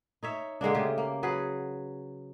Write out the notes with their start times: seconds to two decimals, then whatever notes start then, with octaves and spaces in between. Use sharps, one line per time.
0.23 D#4 C#5 E5
0.61 D3 G#3 A#3 D4
0.74 C#3 A3 G4
0.98 A#3
1.23 F#3 G#4 B4